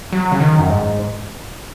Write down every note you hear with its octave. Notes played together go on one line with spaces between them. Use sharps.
F#3
C#3
D#3
F#2
G#2